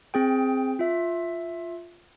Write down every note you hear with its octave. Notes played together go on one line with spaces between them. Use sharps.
C4 G#4 G5
F4 E5